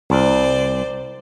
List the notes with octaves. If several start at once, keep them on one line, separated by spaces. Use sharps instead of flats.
C2 C5 D5